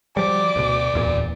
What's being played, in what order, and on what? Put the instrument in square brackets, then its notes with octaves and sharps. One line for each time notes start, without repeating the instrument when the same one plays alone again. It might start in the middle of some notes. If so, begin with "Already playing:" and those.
[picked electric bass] F3 G3 [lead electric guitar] F#4 D5 [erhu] D6
[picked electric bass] D2 B2
D1 E2 A#2